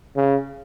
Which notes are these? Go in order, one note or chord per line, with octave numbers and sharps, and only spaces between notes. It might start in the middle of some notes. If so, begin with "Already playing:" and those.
C#3